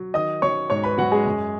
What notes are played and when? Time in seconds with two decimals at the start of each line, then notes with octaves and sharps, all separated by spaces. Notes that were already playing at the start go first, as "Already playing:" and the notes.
Already playing: F#3
0.14 D#3 D#5 D#6
0.42 F#3 C#5 C#6
0.70 G#2 C#5 C#6
0.84 B4 B5
0.98 F#3 F#4 F#5
1.12 G#3 G#4
1.26 F#2